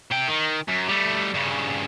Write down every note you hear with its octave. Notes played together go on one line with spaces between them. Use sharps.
C3 G5
D#3
F#2
G3 A3
G2 C#3